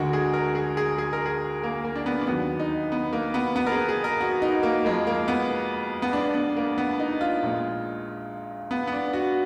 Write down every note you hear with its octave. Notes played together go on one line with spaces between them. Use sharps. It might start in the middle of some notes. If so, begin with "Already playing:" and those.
Already playing: D2 D3 G#3 F#4 A#4
G#4
A#4
G#4
G#4
G#4
A#4
G#4
A#3
A#3
D4
B3
D4
D#2 D#3 F#3 B3
D#4
B3
A#3
B3
B3
A#4
G#4
G#4
A#4
F#4
D#4
A#3
F2 F3 G#3 A#3
A#3
B3
B3
D4
B3
A#3
B3
D#4
F4
A#1 A#2 G#3
B3
B3
D4
F#4